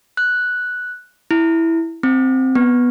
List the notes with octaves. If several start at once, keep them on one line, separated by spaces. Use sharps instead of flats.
F#6
E4
C4
B3